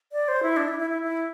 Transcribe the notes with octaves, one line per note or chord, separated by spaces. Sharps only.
D5
C5
E4
D4
E4
E4
E4
E4